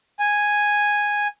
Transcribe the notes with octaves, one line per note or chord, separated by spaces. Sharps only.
G#5